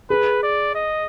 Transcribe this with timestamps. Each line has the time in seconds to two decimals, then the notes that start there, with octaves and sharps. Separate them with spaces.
0.10 G#4 B4
0.43 D5
0.75 D#5